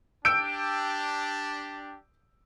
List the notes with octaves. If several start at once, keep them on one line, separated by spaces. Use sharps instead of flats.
D4 G4 E6 G6 D7